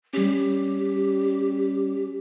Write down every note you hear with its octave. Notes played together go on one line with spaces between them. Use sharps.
G3 C#4 G4